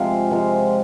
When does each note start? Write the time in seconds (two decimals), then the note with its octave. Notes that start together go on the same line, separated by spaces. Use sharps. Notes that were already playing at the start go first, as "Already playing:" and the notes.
Already playing: C3 F3 G#3 F5
0.31 C3 F3 G#3